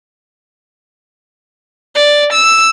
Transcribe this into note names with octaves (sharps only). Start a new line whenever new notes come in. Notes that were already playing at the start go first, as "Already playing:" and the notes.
D5
E6